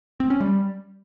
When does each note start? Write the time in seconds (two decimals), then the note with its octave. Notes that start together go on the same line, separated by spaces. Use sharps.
0.20 C4
0.30 C#4
0.40 G3